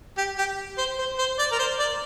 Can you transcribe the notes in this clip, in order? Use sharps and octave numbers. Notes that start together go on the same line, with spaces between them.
G4
G4
C5
C5
C5
D5
A#4
C5
D5